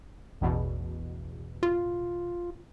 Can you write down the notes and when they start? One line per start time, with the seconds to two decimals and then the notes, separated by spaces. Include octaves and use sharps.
0.41 A1 E2 B2
1.63 F4